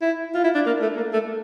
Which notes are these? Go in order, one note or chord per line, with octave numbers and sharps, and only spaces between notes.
E4
F4
E4
D4
A#3
A3
A#3
A3